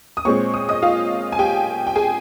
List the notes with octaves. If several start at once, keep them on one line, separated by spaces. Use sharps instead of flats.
D#6
A#2 G#3 C4 C#5 C#6
D#6
D#5 D#6
F4 F5
G#5
G4 G5
G5
G#4 G#5